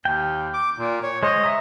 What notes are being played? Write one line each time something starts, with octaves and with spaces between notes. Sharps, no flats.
D#2 G5
D6
A#2
C#5
G#3 C5 C#5 D#5
E5 A#5 D#6